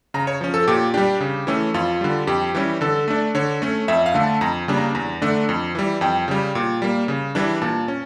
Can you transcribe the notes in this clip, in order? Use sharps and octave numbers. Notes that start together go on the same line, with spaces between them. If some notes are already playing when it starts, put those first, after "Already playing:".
C#3 A#5
C#5
F3 C#4
A4
A#2 G4
G3 D4 G4
C#3
E3 A3 C#4
F2 F4
D3 G3
F2 G4
E3 G3 C#4
D3 A4
A3 D4
D3 C#5
A3 C#4
F2 E5
F5
D3 A3
A5
F2 A#5
C#3 G3 A#3 D4
A#5
E2 A#5
D3 A3 D4
F2
E3 G3
F2 G5
C#3 G3
A#2
G3 A#3
C#3
E3 G3 D4
A#2 A5
C#4